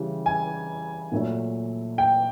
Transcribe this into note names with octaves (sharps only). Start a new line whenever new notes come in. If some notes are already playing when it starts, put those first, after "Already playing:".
Already playing: C#3 E3 G3
G#5
A#2 F#3 A3
G5